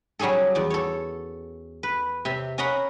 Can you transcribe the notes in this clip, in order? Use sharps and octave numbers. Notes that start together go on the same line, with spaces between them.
F#3 G3 C#4 G#4 A4
E2 D5
A4 C#5
B4
C3 E5 C6
C#4 A#4 D#5 F#5 B5